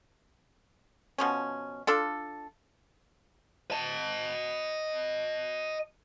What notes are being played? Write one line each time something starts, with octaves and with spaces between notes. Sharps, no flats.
B2 F3 C#4
D4 F4 A4
D#5 A5